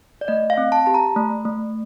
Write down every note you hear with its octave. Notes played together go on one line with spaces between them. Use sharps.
D5
A3 D#5
F5
C4
A5
G4 A5
A#5
A3
A3